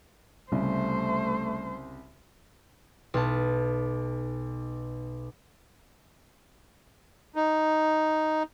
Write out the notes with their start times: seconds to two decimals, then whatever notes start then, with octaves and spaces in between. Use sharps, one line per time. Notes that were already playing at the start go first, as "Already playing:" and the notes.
0.52 C2 C#3 G3 A3 C5
3.14 B1 A5
7.36 D#4